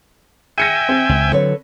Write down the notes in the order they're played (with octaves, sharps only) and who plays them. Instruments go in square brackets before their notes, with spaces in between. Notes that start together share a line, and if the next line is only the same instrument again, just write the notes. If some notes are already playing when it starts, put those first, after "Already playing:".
[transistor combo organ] E5 G5 G#5 [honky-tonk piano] A#6 C#7 D#7
[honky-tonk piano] C4
[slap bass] C#2
[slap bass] D3 F#3 [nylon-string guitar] A4 B4 C#5